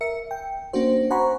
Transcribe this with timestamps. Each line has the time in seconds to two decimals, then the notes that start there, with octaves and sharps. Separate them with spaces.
0.01 A#4 E5 C#7
0.31 G5
0.73 A#3 C#4 D4 F#4 C5
1.10 C5 F#5 G#5 A#5 B5 C#6